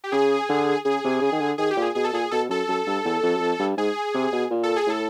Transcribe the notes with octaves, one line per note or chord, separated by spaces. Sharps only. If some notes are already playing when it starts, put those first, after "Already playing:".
G4
C#3 G#4
D3
C#3 G#4
C3
C#3
D#3
D3
D#3 G#4
G4
A#2
G#4
B2 G#4
A4
A#2 G#4
B2 A4
F#2 A4
F#2
G2
E2
F2
F#2
F2
G2
G#2 G#4
C3
B2
A#2
A4
G#4
A2 A4